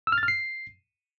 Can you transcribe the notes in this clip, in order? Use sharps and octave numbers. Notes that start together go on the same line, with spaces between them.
E6
F6
A6
F6
C7